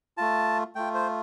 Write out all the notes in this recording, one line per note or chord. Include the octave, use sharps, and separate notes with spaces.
A3 F4 A5
A3 F4 G5
C5